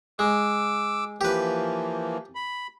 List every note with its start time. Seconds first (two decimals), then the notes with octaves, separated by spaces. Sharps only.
0.19 G#3 D6 E6
1.21 E3 F3 A#3 G4 B4
2.35 B5